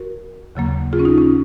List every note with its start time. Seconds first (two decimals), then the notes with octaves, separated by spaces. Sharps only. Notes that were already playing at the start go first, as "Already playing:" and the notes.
Already playing: F#4 A#4
0.55 D#2 C#3 F#3 A#3
0.93 F4 G#4
0.99 C#4
1.05 D#4
1.18 C#4